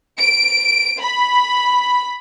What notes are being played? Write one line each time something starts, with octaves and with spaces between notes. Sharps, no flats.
D7
B5